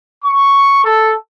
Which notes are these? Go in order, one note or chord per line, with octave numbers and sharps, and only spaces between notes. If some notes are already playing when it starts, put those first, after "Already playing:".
C#6
A4